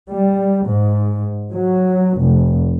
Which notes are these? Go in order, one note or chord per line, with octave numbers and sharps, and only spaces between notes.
G3
G#2
F#3
F1